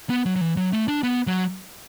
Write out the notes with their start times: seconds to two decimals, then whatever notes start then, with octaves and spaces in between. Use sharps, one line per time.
0.10 B3
0.26 F#3
0.36 F#3
0.41 E3
0.57 F#3
0.73 A3
0.88 D4
1.03 B3
1.27 F#3